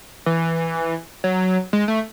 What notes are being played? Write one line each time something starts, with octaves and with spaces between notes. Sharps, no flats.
E3
F#3
G#3
A3